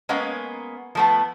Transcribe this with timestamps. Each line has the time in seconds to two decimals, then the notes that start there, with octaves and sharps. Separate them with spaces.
0.09 G#3 A#3 B3 C#4 F5
0.95 F3 A3 B3